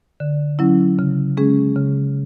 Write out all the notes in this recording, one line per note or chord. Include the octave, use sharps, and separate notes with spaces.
D3
F#3 C#4 E4
C#3
G#3 C#4 G#4
C#3